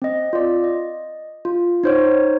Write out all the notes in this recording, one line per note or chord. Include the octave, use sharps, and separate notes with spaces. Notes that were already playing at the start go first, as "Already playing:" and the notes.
C4 D#5
F4 D5
D#5
F4
D#4 C5 C#5